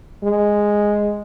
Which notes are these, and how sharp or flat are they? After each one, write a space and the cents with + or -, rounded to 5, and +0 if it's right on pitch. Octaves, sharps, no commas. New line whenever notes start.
G#3 -5